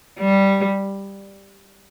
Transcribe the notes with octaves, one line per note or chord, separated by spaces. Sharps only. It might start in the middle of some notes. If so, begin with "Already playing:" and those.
G3